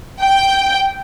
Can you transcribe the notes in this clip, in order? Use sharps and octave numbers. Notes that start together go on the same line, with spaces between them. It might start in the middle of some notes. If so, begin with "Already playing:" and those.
G5